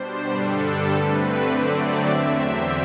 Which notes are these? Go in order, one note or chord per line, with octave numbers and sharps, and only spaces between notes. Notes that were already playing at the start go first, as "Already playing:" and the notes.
Already playing: B2 G3 D4 C5
G2 D3 G3 D4 A4
D3 A3 C4 B4
D3 F#3 A3 C4 D5
E5
E2 D3 F#3 C4
G5